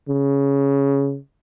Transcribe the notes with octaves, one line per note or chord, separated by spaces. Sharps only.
C#3